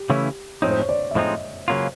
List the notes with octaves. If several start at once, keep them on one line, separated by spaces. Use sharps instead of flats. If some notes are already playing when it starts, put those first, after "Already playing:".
Already playing: G4
C#3 E3 A3 C#4 E4
A2 F3 G#3 C4 D#4 C#5
C5
C#5
D5
E5
A2 F3 G#3 C4 D#4 D#5
C#3 F#3 A#3 C#4 F4